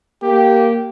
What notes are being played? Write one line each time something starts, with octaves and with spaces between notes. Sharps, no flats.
A#3 G4